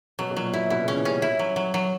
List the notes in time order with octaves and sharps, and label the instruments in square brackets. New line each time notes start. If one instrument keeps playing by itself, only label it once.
[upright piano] B2 [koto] F#3
[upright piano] B2
[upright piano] A#2 [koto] F#3
[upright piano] B2 [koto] E4
[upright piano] B2 [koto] E4
[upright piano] C#3 [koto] C#4
[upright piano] E3
[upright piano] G3 [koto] C#4
[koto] E4
F#3
F#3
F#3